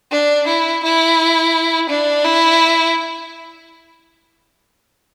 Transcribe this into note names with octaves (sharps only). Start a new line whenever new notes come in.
D4
E4
E4
D4
E4